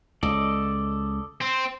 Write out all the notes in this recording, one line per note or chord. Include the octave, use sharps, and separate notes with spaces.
C#2 A4 D5 D#5
C4